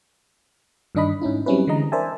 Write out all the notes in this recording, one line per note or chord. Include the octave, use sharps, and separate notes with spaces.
G2 D#3 D4 D#5 B5
G#2 C#4 D#4 E4
F#3 G3 C4 C#4 E4 B4
D3 E3 G#3 D#5 A#5
A#4 C5 D5 E5 G#5 A5